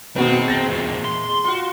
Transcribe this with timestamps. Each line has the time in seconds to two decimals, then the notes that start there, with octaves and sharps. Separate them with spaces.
0.16 B2 D#3 G#3 A3 C4 F#4 B4
0.48 A6 A#6
0.69 E2 A#2
1.05 C6
1.44 F4 F#4